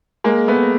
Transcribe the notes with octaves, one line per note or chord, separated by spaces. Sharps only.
G#3 A#3
A3 B3